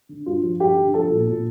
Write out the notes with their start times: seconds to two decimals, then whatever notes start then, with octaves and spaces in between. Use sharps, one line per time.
0.09 D3
0.26 G2 F4
0.43 F3
0.60 G2 G4
0.77 D3
0.94 F3 A4
1.11 A#2
1.28 A#2